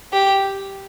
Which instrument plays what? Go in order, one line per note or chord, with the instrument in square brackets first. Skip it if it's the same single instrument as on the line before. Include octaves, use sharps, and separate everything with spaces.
[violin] G4